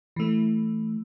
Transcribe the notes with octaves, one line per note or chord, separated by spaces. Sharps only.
E3 A3